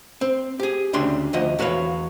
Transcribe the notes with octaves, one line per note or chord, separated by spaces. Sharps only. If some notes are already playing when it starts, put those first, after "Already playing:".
C4
G4 G#4
D2 C#3 D4 G5 C6
D2 F3 D#5 F#5
E2 F#4 B4 C#5 F5